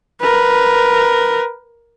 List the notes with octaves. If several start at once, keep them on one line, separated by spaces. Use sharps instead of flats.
A#4 B4